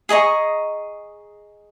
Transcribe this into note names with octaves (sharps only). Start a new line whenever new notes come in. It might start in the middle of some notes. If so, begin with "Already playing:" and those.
G#4 D#5 A#5 C#6